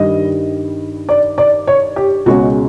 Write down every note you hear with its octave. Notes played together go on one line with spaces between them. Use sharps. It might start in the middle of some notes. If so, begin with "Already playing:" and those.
Already playing: G2 D#3 G3 D#5
D5
D5
C#5
G4
C#2 B2 G#3 C#4 F#4